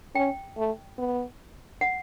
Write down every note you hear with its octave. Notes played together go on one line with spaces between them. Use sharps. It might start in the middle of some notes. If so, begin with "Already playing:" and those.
C#4 G5
A3
B3
F#5